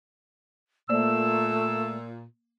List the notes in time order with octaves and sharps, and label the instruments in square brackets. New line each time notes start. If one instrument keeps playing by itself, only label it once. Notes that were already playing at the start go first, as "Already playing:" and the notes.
[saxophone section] A#2 [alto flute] A3 [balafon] A#3 C5 D5 [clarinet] E6